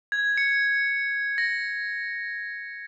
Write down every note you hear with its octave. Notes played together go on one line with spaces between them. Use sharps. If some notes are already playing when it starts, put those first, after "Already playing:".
G#6
C#7
A#6